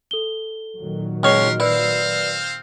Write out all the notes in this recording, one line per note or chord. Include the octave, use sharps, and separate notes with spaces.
A4 G7
A#2 D#3 F#3
C#2 A#4 B4 C#5 D#5 C6 F6
C4 E4 B4 C5 D5 F5